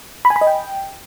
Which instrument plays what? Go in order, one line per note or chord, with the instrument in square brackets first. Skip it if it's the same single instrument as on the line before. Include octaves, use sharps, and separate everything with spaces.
[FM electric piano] B5
G#5
B5
D#5
G5